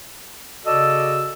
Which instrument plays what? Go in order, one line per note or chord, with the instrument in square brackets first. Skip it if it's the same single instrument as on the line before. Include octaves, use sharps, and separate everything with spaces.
[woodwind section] C#3 F#4 A4 D5 D#5 E6